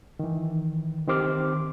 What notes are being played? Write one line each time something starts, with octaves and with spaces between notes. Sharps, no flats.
D#3 E3
D#3 C4 G4 C5 D6 F6